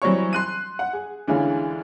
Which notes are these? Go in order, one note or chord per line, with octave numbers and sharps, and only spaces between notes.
E3 F#3 G3 C4 C#5 C#6
C6 F#6 D#7
F#5
G#4
D2 D3 E3 G#3 C#4 F4